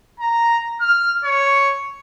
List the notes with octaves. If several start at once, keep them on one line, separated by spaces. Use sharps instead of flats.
A#5
F6
C#5